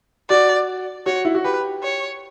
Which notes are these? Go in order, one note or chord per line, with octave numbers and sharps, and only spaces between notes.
F#4 D5
F#4 C#5
E4
F#4
G4 B4
C#5